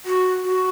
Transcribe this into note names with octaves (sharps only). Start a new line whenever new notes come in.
F#4
F#4